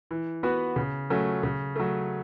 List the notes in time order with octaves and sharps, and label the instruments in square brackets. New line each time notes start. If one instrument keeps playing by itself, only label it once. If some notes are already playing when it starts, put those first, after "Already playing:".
[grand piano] E3
B3 F#4 B4
C#3
F#3 A3 C#4
C#3
F#3 A3